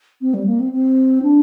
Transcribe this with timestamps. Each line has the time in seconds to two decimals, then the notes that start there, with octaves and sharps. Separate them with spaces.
0.21 C4
0.34 G3
0.46 A#3
0.60 C4
0.72 C4
1.22 D4